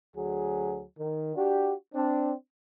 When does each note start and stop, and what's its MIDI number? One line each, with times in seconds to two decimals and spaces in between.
0.16 0.83 38
0.16 0.83 54
0.16 0.83 68
0.98 1.34 51
1.35 1.73 62
1.35 1.73 66
1.35 1.73 67
1.93 2.33 60
1.93 2.33 62